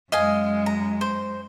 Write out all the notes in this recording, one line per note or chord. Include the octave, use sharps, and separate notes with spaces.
F#2 G#3 D#5 F5 G#5
A#5
C5